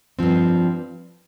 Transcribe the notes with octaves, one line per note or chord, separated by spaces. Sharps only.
G2 F3 C4